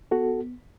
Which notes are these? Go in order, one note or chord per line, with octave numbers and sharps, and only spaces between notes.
B3 F#4 A4